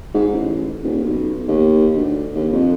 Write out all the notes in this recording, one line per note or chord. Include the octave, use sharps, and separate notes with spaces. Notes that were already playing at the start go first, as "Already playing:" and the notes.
G#2
A1
D#1
B1
D#2
D2
D#2
F2